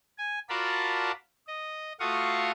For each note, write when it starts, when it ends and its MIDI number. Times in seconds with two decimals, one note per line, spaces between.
0.18 0.39 80
0.49 1.12 65
0.49 1.12 66
0.49 1.12 70
0.49 1.12 74
0.49 1.12 81
0.49 1.12 83
1.47 1.93 75
2.00 2.51 57
2.00 2.51 65
2.00 2.51 66
2.00 2.51 77
2.00 2.51 85
2.00 2.51 87